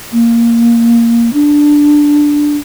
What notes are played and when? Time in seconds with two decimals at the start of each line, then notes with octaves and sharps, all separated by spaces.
0.13 A#3
1.33 D4